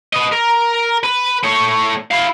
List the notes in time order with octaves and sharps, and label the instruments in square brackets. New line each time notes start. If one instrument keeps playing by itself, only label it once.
[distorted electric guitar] B4 D#5
A#4
B4
A3 C#5
E4 F5